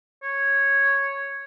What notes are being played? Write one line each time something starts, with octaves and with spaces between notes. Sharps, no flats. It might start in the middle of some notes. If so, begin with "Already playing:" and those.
C#5